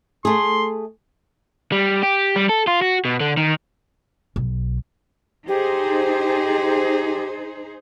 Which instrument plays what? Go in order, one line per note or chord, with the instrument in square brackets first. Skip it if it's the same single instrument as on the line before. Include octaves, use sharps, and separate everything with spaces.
[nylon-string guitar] A3 G#4 [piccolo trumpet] C6
[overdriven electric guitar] G3
G4
G3
A4
F4
F#4
B2
D3
D#3
[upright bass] B1
[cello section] D#4 G#4 C5 [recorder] G4